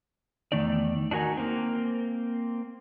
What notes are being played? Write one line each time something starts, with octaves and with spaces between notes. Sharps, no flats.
E2 G#2 D#3 A3 D#4 D5
D4 D#4 F#4 A#4 G#5
A#3 C4